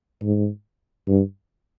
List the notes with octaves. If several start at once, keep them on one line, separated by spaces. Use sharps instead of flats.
G#2
G2